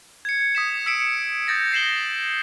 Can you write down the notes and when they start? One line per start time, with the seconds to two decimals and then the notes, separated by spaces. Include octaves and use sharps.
0.25 G#6 C#7
0.55 D#6 B6 E7
0.86 E6 B6 C#7 D7 E7
1.47 D#6 G6 A6 A#6 D7
1.72 A#6 C7 E7 F#7 G7